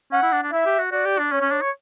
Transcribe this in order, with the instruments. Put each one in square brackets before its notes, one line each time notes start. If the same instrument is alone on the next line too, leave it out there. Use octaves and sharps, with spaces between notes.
[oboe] C#4 [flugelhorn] F#5
[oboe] E4
D4
D4
[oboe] E4 [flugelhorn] E5
[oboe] G4
F#4
[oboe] F#4 [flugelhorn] D5
[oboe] G4
D4
[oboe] C#4 [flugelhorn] C#5
[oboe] C#4
D4
C#5